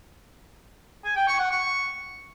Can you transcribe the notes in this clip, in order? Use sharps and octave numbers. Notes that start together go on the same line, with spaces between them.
G#5
G5
C#6
F#5
C#6